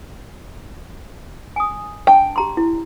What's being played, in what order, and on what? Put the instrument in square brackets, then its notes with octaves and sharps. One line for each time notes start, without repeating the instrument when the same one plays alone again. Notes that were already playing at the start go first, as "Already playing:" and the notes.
[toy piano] G#5 D#6
[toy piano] D4 A5 [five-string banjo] G5
[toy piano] G4 A#5 C6
E4